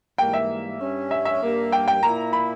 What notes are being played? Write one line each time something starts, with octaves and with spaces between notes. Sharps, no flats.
G#2 E3 G3 A#3 G5
E5
G2 G3 C#4
E5
E5
G2 G3 A#3
G5
G5
A#2 A#3 E4 A#5
B5